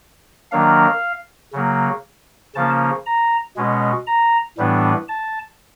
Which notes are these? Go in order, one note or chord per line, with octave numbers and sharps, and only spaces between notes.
D#3 F#3 A#3 D4 F5
C#3 F#3 A#3
C#3 F3 A#3 C#4 A5
A#5
B2 G#3 C#4
A#5
A2 E3 G3 B3 D4
A5